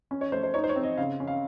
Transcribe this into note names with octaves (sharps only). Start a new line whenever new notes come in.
C#4
C#5
A3 C5
C5
D#4 C#5
C5
C#5
C4
D#5
C#3 F5
C#4
F5